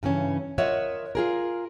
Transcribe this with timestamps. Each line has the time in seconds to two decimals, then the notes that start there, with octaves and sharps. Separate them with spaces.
0.03 G2 C#3 E3 C#4
0.58 F4 A#4 C#5 D#5 E5 F#5
1.15 F4 G#4 A#4